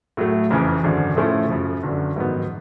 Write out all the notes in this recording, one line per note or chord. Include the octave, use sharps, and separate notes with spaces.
A2 F#3 A3
F#1 F2 C#3 E3
G#1 F#2 D3
A2 F3 A3 C#4 E4
F#2 C#3 F3
G1 F#2 D3
A1 G#2 D#3 F#3 B3